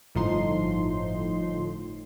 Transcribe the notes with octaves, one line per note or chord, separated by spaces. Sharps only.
G1 A2 F3 D#4 C6